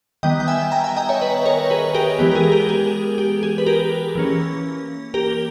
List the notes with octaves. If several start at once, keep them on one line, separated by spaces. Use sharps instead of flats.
D#3 G3 B3 D#5 G5
G5
E5 G#5
G5 A#5
E5 G#5
D#5 G5
C#5 E5
B4 D#5
A#4 C#5
G#4 B4
G4 A#4
E3 G#3 B3 G4
A#4
G#4
G4 A#4
G#4
G4
G#4
B4
G4 A#4
E3 A#3 C#4
G4 A#4